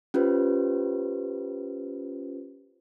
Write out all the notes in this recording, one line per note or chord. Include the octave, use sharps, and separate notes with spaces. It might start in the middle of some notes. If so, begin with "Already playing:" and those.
C#4 F4 G4 B4 C5